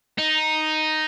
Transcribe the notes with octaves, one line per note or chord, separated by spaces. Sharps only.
D#4